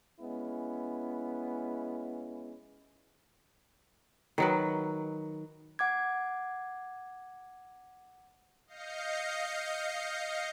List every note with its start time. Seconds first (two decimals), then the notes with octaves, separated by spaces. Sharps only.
0.20 G#3 B3 C#4 E4
4.38 D#3 F#3 B4
5.79 F#5 D6 G#6
8.67 D#5 F5 G6 A#6 C7 C#7